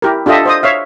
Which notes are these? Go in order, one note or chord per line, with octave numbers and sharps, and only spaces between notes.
E4 G4 A#4
D4 F4 G4 A4 D#5 E5
C5 D#5 D#6
C#5 E5 F5